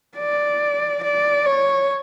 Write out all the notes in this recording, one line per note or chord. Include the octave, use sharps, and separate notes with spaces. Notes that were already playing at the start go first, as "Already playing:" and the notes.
D5
D5
C#5